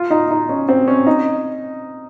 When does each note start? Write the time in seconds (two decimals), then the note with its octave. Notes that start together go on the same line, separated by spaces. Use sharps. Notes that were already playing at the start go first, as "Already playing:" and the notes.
Already playing: F4
0.10 D#4
0.31 D#4
0.49 C#4
0.69 C4
0.88 C#4
1.07 D#4